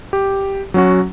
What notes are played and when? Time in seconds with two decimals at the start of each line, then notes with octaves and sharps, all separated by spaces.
0.13 G4
0.74 F#3 C#4 F#4